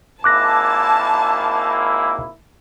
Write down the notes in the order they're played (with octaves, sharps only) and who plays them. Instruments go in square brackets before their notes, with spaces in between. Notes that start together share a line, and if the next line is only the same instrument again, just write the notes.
[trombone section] G#1 A#3 E4 [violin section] A5 [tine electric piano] D6 F#6 A#6